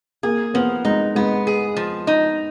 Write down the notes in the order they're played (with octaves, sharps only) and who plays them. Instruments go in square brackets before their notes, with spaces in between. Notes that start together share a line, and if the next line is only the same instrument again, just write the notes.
[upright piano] A#3 [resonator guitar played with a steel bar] G#4
[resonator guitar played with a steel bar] F3 [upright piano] B3
[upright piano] G#3 [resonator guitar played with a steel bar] D#4
[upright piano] G#3 [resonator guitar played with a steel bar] B3
[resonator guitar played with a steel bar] G#4
F3
D#4